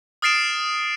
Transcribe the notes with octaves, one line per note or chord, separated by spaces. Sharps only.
D#6 F6 A6 C7 D7 E7